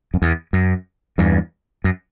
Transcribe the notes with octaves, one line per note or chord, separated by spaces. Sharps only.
F#2
E2
F#2
E2 G2
F#2